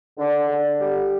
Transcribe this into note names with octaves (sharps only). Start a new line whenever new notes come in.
D3
D3
G3